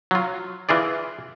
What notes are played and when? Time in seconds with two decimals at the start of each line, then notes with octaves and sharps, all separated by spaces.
0.11 F#3 F4
0.69 E3 F4 G#4 D5